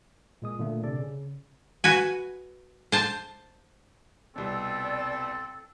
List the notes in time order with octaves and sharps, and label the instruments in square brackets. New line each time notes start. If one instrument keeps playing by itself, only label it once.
[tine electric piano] A#2 G#3 D#6
A#2 D3 A3
C3 D4 A4 D5
C#3
[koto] F#4 B4 G#5
C5 A5
[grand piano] C2 B2 [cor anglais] C4 [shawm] A4 [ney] D5